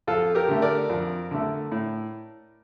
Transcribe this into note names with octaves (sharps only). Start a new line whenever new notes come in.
F2 F4 A4
G4 A#4
D3 A3
A#4 D5
F2
D3 A3
A2